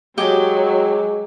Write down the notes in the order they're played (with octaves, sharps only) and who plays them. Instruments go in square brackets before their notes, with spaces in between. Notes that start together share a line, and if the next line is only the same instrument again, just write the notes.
[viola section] F#3 [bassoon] G#3 [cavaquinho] G4 D#5 G#5